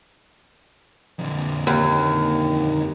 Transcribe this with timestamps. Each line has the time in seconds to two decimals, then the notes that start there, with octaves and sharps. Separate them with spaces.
1.19 F2 D3
1.67 D#2